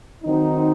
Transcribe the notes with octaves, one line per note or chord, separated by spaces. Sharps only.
D#3 F#3 C4 D#4